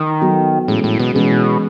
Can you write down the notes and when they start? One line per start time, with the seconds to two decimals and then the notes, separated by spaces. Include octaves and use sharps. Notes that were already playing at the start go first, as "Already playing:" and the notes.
Already playing: D#3
0.22 F#3 B3 F#4 A4
0.68 A2 E3 G#3 C#4 G#4
0.84 A2
0.99 B2
1.15 B2 E3 G#3 C#4 G#4